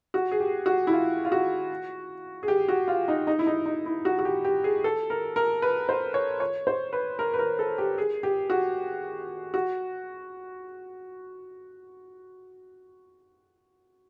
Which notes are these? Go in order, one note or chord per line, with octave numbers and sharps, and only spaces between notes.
F#4
G#4
G4
F#4
E4
F4
F4
F#4
G#4
G4
F#4
F4
D#4
D#4
E4
D#4
D#4
E4
F#4
F#4
G4
G4
G#4
A4
A#4
A#4
B4
C5
C#5
C#5
C5
B4
A#4
B4
A#4
A4
G4
G#4
G4
F#4
F#4